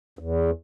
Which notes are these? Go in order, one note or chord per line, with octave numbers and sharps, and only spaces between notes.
E2